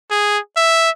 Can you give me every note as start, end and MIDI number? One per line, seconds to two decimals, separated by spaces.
0.11 0.39 68
0.57 0.90 76